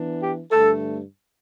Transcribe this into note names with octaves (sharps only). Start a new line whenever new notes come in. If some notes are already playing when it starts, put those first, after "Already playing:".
Already playing: E3 B3 D4
G4
G2 D3 A3 A4